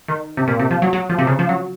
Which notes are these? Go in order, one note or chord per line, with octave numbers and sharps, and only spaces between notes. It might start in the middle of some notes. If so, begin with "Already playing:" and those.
D#3
C3
A#2
C3
F3
F#3
F#3
F3
C3
C#3
F3
F#3